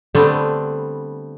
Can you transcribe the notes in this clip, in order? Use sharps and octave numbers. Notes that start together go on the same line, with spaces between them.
D3 G3 A3 B3 C4